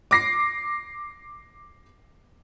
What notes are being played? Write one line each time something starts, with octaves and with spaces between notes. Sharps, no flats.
D6 A#6 C7